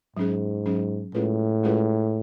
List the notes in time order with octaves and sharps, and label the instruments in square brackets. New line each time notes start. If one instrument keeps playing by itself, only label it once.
[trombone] G#2 [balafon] F#3 C#4 G#4
[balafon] F#3 C#4 G#4
[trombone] A2 [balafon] G#3 C#4 F4 G#4 B4
[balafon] G#3 C#4 F4 G#4 B4